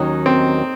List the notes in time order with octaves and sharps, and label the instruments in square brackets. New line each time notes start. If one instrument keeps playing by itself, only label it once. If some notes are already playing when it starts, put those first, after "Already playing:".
Already playing: [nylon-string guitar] D#2 D#3 F#3 C#4 [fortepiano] D#4
[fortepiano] C4